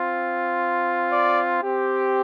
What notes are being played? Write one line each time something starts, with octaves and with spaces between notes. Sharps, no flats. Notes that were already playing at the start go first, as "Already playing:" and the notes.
Already playing: C4 F4
D5
C4 G4